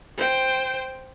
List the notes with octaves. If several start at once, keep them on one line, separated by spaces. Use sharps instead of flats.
C5 G5